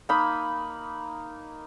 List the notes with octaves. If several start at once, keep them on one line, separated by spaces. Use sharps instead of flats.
A#3 D#4 B5